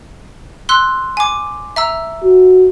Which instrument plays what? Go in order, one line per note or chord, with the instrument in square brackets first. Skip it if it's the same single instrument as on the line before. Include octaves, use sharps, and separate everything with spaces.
[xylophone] C6 E6 F#6
G#5 D6
E5 A#5 E6
[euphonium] F#4